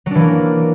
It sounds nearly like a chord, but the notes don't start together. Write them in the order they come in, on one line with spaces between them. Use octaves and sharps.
F#3 D4 E3 A#3